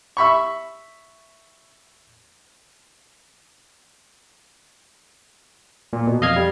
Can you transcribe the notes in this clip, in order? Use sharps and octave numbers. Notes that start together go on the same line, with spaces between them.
E5 B5 C#6
A#2
B2
F2 D#5 F5 F6 G#6
G3